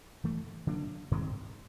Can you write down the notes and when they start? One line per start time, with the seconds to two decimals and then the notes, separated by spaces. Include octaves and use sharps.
0.24 G#2 E3 A3
0.67 D3 F#3 A#3 D4
1.11 G2 D#3 G#3 C4